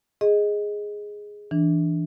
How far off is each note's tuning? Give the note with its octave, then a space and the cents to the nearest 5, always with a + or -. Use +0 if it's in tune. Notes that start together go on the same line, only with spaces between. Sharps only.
G#4 +0 D#5 +0
E3 +0 D4 +0